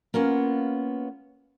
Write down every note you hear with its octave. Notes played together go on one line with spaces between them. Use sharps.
A#3 B3 C#4 F4